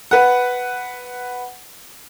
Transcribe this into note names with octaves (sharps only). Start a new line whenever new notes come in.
B4 F#5